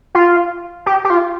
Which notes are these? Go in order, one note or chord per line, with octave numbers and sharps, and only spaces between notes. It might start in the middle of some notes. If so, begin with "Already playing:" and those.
F4
G4
G4
F4